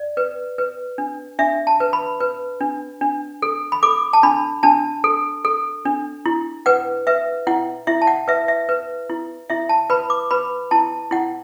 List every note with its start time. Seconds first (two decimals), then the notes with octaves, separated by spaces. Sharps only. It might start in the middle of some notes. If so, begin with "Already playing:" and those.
Already playing: D5
0.17 B4
0.58 B4
0.98 D4
1.39 D4 E5
1.67 A5
1.80 B4
1.93 B5
2.20 B4
2.61 D4
3.01 D4
3.42 A4
3.72 B5
3.83 A4 D6
4.13 A5
4.23 D4 B5
4.63 D4 A5
5.04 A4
5.45 A4
5.85 D4
6.26 E4
6.66 B4 F#5
7.07 B4 E5
7.47 E4 F#5
7.87 E4 E5
8.02 A5
8.07 F#5
8.28 B4 E5
8.48 E5
8.69 B4
9.10 E4
9.50 E4 E5
9.69 A5
9.90 B4 B5
10.10 D6
10.31 B4 B5
10.71 E4 A5
11.11 E4 F#5